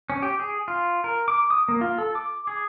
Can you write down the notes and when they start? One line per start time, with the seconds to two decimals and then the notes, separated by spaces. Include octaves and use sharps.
0.10 C#4
0.22 G4
0.40 G#4
0.68 F4
1.04 A#4
1.28 D6
1.50 D#6
1.68 A#3
1.81 F4
1.98 A4
2.15 D6
2.47 G#4